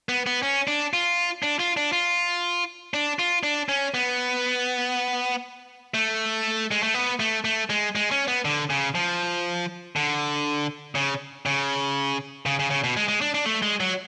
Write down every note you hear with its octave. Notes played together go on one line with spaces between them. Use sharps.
B3
B3
C#4
D4
F4
D4
F4
D4
F4
D4
F4
D4
C#4
B3
A3
G#3
A3
B3
A3
A3
G#3
G#3
C#4
B3
D3
C#3
F3
D3
C#3
C#3
C#3
C#3
C#3
B2
G#3
G#3
D4
D4
A3
G#3
F#3